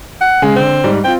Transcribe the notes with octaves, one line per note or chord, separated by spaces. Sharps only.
F#5
C#3 G#3 G#4
D3 C4
G#2 G3
C4 F4 G5